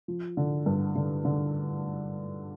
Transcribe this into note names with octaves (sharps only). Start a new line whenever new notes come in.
F3
D3
G2
D3
D3